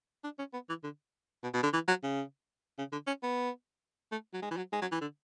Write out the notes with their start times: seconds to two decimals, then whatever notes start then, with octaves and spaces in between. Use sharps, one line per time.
0.24 D4
0.39 C#4
0.53 B3
0.69 E3
0.84 D3
1.43 B2
1.54 B2
1.63 D3
1.74 E3
1.88 F#3
2.03 C#3
2.78 C#3
2.92 D3
3.07 C#4
3.23 B3
4.12 A3
4.34 F#3
4.42 G#3
4.51 E3
4.57 F#3
4.72 G#3
4.81 F#3
4.92 E3
5.01 D3